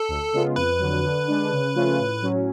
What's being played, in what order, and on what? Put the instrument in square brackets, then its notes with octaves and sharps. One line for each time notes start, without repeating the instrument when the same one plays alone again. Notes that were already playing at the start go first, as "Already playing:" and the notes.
Already playing: [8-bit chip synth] A4
[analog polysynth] D2
C#3 G#3 B3 F4
[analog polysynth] F2 [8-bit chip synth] B4
[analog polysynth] D3 F#3
D3
G#3 D4
C#3
F3 A3 C#4 F4
A2
F#3 C#4